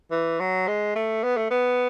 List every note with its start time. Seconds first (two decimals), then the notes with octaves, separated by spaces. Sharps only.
0.11 E3
0.40 F#3
0.68 G#3
0.95 A3
1.24 B3
1.37 A3
1.51 B3